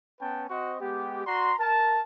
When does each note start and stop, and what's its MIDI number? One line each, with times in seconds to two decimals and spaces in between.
0.21 0.45 59
0.21 0.45 61
0.21 0.45 71
0.21 0.45 79
0.21 0.45 81
0.50 0.77 60
0.50 0.77 66
0.50 0.77 72
0.50 0.77 75
0.50 0.77 85
0.81 1.25 56
0.81 1.25 59
0.81 1.25 67
1.27 1.54 66
1.27 1.54 74
1.27 1.54 82
1.27 1.54 84
1.59 2.01 70
1.59 2.01 81